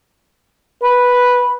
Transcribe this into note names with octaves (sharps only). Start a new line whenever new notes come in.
B4 B5